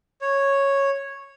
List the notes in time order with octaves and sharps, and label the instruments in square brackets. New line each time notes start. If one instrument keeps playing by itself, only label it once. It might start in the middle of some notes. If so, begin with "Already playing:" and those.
[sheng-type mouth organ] C#5